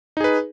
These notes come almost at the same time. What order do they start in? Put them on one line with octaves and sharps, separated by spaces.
D#4 G#4 B4